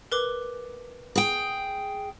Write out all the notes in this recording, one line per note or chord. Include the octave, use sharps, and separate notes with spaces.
A#4 B4 D6
G#4 G5